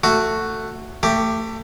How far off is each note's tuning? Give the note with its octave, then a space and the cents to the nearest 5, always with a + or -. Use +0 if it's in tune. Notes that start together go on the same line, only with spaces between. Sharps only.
A3 +10 F#4 +0
A3 +25 G4 +0